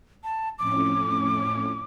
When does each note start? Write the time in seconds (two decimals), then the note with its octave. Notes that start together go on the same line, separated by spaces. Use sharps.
0.24 A5
0.59 F2 A2 C#4 D6